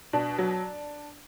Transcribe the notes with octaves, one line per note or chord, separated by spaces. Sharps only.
B2 D4
F#3